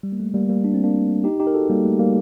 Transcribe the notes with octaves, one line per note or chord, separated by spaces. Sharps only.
G3
A#3
A3
G3 A#3
G3 A#3
D4
C4
A#3 D4
D#4 G4
D#4 G4
A#4
F#4 A4
G3 A#3
A3
G3 A#3